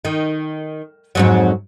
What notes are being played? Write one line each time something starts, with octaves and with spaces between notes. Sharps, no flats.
D#3
F2 G#2 F#3